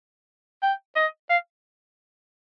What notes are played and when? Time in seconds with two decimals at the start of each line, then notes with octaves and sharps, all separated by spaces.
0.63 G5
0.96 D#5
1.30 F5